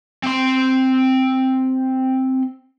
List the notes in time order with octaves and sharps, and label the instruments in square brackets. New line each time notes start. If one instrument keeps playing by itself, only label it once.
[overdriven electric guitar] C4 C6